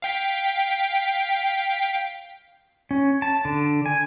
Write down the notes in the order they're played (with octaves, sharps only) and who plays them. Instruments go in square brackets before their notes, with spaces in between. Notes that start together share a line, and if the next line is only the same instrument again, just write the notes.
[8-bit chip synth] F5 G5 B6
[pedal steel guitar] C#4
A5
D3
G#5